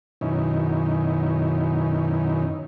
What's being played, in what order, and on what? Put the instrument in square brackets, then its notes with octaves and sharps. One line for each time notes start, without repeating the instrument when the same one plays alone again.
[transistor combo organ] F#2 B2 D#3 C#4 D#4 E4